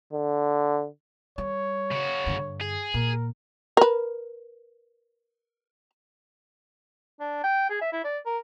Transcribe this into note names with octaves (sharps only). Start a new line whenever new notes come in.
D3
G3 C#5
C#3 F#4
G2 D3
G#4
A#2 A#4
A#4 B4
D4
G5
G#4
E5
E4
D5
A#4